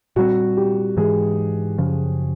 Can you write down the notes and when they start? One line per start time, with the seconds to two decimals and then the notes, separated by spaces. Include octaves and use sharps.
0.16 A#2 G3 C4 F#4
0.57 G4
0.97 G#2 E3 G#3 G#4
1.78 F#2 C#3 F3